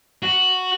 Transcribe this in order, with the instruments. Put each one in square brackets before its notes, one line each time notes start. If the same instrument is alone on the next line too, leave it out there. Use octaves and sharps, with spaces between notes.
[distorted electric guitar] F#4